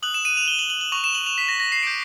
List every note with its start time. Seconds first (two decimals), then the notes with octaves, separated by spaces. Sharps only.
0.03 D#6 F#6 F#7
0.14 E7
0.25 D#7
0.37 F7
0.48 G7
0.59 F#7
0.70 F#7
0.81 F#7
0.92 C#6 F#6 F7
1.04 E7
1.15 F#7
1.26 F7
1.38 B6
1.48 A#6
1.60 A#6
1.72 C7
1.83 D6 G6 D7